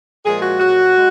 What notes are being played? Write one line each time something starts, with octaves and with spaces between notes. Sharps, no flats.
A#2 F3 G#3 G#4
F#4
A#2 F#3 F#4
G#3